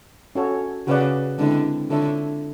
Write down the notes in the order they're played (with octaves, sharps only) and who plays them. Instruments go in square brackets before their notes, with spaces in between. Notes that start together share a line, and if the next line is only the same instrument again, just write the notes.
[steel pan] C#4 F#4 A4 C#5
[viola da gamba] C#3 [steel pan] F#4 B4 D5 F#5
[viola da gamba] D3 [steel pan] G#3 C4 E4 A4
[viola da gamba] D3 [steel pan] F4 A4 C#5 E5